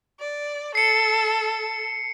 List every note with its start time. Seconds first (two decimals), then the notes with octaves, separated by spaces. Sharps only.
0.20 D5
0.75 A4 C7 C#7